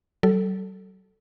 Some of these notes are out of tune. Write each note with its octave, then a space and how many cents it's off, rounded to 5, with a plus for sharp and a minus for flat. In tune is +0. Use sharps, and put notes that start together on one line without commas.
F#3 +45 A4 +0